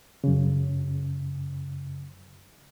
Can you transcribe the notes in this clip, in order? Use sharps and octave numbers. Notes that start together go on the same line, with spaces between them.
F#2 C#3